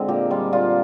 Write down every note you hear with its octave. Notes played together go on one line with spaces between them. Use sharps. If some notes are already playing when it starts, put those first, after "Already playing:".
Already playing: D3 G#3 C4 F4
A#2 G4
G3 F4
A#2 F4